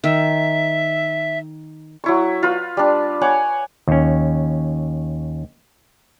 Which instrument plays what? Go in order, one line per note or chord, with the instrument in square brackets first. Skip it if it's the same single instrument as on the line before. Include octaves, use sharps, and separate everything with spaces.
[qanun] D#3 [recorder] E5
[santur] F#3 E4 C#6
F4 B4
G3 D4
C#5 F#5 G#5 D6
[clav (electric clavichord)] D#2 C#4